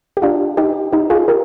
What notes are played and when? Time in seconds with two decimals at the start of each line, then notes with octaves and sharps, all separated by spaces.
0.17 G4
0.22 D4 F4
0.57 D#4 G4
0.93 D#4 G4
1.10 F4 G#4
1.28 G4 A#4